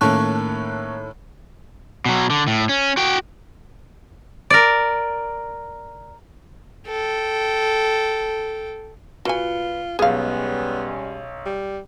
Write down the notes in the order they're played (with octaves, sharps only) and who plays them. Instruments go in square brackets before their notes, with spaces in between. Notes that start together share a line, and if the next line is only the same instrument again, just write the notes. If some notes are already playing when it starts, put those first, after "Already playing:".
[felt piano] A2 D#3 [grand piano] A3 A#3 C#4 [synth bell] A5 C#6 F#6
[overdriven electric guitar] B2 F#3
D3
A2
C#4
F#4 G5
[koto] A#4 D5
[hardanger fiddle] A4 G5
[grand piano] A#2 B4 C#7 [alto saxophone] F4 [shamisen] F#4 G#5
[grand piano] B1 B2 [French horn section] G3 G#3 C#4 [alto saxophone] B3 [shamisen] G#4 F5
[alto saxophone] G3